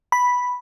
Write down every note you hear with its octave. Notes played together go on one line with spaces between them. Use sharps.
B5